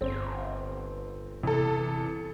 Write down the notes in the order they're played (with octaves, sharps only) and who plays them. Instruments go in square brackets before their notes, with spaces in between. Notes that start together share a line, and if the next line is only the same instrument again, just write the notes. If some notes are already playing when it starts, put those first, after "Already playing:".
[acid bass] G1 [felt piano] C4
[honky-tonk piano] E2 A4 [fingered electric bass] C3